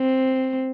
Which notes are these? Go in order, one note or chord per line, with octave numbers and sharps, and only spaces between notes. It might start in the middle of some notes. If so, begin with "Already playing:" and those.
Already playing: C4